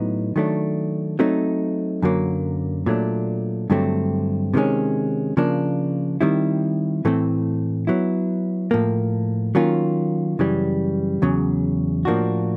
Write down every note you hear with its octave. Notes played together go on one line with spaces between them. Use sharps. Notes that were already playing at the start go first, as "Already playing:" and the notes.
Already playing: A2 F#3 B3 D#4
D#3 F#3 A3 D4
F#3 A3 C4 D#4
F#2 D3 F#3 A#3
A#2 F#3 A3 D4
G2 D3 F#3 A3 C4
C3 D#3 G#3 C#4
C#3 F3 A#3 D4
D#3 G3 C4 E4
A2 E3 A3 C4
F#3 B3 E4
A2 F3 A#3
D#3 F#3 A#3 C#4 F4
F#2 C#3 E3 G3
E2 C#3 F#3
A2 F3 A#3 D4 F#4